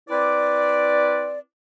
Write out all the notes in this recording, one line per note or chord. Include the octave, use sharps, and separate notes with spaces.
C4 E4 B4 D5